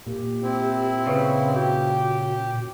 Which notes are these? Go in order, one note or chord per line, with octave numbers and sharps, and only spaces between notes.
A#2 G4
C4 E4
C#3 B4
F#4 G4